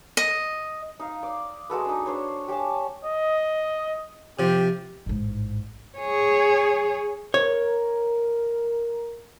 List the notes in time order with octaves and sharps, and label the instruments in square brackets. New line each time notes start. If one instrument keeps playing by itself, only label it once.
[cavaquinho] D#5
[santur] D#4 F5
D5
G#3 F#4 A4 B4
D4 D#4
D4 C5 C#5
G4 C#5 G#5 A5
[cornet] D#5
[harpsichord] C3 F3 [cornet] G4
[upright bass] A1 G#2
[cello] G#4 C#5
[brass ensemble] A#4 [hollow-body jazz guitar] C#5